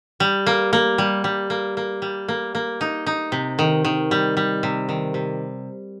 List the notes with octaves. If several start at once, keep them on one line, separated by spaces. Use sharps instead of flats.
G3
A#3
A#3
G3
G3
A#3
A#3
G3
A#3
A#3
D#4
D#4
C3
D#3
D#3
G3
G3
C3
D#3
C3